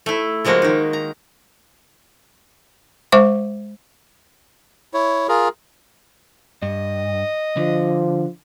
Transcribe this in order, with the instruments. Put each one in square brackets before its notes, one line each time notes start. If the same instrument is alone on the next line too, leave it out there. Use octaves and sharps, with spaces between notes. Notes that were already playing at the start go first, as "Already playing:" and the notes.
[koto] A3 E4
C#3 F3 G#3 A#3 F#4
D#3 D#4
A#5
[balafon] G#3 C5 E5 C#6 D6
[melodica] E4 C#5
F4 G#4 A#4
[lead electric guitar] G2 [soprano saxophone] D#5
[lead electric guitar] D3 [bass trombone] F3